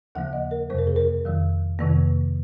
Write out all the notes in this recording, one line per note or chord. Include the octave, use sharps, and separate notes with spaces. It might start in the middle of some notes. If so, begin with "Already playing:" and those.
D#2 C#3 F3 A#3 F#5
D#5
A#4
F2 C3 F#3 A#3 C5
A#4
G#4
A#4
F2 D#3 F#3
F2 C3 D#3 A#3